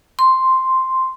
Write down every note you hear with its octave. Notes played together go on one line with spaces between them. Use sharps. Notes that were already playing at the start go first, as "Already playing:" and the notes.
C6